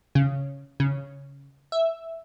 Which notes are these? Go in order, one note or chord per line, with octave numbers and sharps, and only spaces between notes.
C#3
C#3
E5